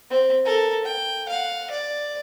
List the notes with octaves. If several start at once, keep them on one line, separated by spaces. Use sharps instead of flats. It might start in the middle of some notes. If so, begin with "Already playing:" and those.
C4
A4 A#4
G5
F5 F#5
D5